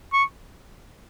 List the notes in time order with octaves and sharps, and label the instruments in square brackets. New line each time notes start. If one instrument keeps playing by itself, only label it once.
[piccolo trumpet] C#6